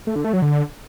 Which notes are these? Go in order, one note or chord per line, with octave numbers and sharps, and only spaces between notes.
A3
D3
A3
F#3
D3